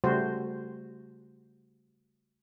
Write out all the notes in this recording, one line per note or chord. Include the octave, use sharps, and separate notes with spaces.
C#3 G3 A3 F#4 C5